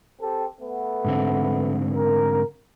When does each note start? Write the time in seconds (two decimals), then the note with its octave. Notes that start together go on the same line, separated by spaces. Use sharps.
0.21 C4 G4 A4
0.60 A3 B3
1.05 G#2 D3 C4
1.94 A#4